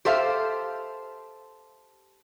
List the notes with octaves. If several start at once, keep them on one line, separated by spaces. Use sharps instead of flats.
G4 A4 C5 E5 F5